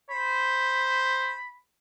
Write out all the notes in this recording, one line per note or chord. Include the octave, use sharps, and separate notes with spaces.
C5 B5